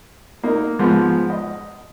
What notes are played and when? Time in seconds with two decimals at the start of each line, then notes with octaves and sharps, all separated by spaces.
0.43 A#3 D#4
0.79 G#2 F3 G#3 B3
1.30 D#5